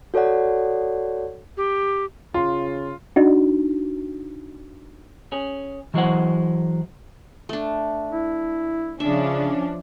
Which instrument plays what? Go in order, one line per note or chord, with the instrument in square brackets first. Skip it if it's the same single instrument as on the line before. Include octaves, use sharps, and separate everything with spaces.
[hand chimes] F#4 A4 C#5 D5 F#5
[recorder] G4
[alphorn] C#3 [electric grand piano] F4 [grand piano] C6
[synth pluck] D4 D#4 F#4
[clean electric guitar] C#4 G#4
E3 F#3 G#3 E4 C5 F#5
[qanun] A3 D4
[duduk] E4
[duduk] C#3 [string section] F3 C#4 D4 [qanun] E5